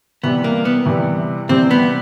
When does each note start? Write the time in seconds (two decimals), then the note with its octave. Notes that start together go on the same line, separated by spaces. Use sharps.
0.24 C3 E3 G3 B3
0.44 A#3
0.65 B3
0.86 C3 E3 G3
1.49 C3 E3 G3 C4
1.71 B3